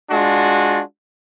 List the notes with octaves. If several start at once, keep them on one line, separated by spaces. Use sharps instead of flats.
G#3 D4 F4 F#4